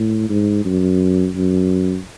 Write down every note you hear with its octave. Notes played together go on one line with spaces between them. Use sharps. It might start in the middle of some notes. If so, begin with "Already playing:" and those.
Already playing: A2
G#2
F#2
F#2